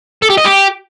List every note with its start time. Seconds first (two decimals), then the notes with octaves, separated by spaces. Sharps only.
0.22 A4
0.30 G4
0.37 D#5
0.45 G4